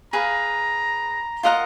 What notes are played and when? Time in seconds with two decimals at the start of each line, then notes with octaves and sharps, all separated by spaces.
0.13 G#4 B4 F5 A#5
1.43 F4 A#4 D#5 F#5